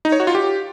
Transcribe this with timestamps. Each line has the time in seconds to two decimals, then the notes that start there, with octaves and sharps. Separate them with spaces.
0.05 D#4
0.12 C#5
0.20 F#4
0.27 F4
0.35 G4